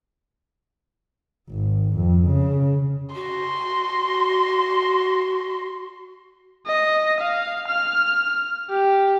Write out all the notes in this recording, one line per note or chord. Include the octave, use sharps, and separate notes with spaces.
G#1
F2
C#3
F#4 C6
D#5
F5
F6
G4